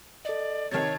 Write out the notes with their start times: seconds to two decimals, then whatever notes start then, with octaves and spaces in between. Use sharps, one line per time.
0.25 A4 D5 D#5
0.71 C3 D#3 C#5 A5 G#6 A6